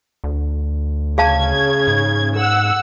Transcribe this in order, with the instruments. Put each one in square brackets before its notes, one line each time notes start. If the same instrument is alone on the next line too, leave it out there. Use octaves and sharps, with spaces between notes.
[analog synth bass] D2
[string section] C#3 G#6 [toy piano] G#4 F5 A5
[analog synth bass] G#2
[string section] F#5 E6